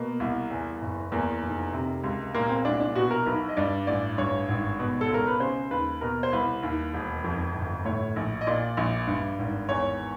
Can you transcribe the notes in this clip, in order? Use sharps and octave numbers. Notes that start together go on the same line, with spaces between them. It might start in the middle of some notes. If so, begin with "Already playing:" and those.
Already playing: B2 A#3
C2
E2
F#1
E2 A#3
F1
C3
C#2
A#2 A#3
C4
C2 D4
D4
B2 F#4
A#4
B1 B4
D#5
G2 D5
A1 D5
G2 C#5
G#1
B2
A4
C#2 A#4
B4
C#3 C5
D#2 B4
B2 A#4
C5
C2 B4
D#2
E1
F2
G1
A2 C#5
A#1
D#5
A#2 D5
A#1
G2
G#1
E2 C#5